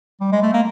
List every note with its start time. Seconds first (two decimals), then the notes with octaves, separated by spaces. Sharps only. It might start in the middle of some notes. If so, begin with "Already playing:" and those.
0.21 G3
0.32 G#3
0.42 A3
0.53 A#3